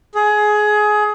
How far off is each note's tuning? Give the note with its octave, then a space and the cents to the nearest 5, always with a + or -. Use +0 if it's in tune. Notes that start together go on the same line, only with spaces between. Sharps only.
G#4 +20